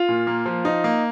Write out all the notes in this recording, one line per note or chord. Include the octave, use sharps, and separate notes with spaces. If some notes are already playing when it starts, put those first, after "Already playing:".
Already playing: F4
A#2
A#3
F3
D#4
A#3